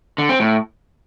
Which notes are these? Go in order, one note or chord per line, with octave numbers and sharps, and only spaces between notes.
D3
C4
A2